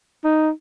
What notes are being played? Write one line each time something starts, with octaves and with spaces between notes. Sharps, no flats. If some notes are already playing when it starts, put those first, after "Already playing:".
D#4